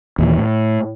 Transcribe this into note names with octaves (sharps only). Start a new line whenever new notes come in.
D#2 A#2 E3
A2